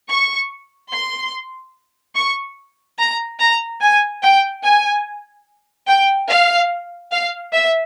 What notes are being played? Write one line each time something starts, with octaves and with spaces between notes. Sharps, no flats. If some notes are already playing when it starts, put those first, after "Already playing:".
C#6
C6
C#6
A#5
A#5
G#5
G5
G#5
G5
F5
F5
E5